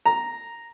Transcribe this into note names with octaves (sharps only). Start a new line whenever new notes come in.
A#5